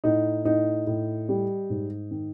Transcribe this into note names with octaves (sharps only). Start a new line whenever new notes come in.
A2 D#4
A2 D#4
A2
G3
G#2
D#3